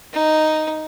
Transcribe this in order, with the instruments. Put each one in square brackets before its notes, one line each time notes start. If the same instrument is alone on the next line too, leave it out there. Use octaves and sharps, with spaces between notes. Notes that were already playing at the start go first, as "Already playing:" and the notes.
[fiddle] D#4